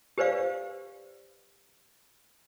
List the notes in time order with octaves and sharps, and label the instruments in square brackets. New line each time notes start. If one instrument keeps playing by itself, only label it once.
[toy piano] G4 B4 C5 D5 F5